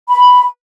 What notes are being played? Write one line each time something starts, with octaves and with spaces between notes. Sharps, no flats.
B5